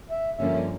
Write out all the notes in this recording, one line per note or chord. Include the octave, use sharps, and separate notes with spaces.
E5
G2 D3 F3 A#3 C#4 E5